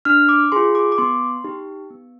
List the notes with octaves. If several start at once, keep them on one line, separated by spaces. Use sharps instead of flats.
D4 F6
D6
F4 G#4 C6
D6
D6
B3 C6
D#4 G4
B3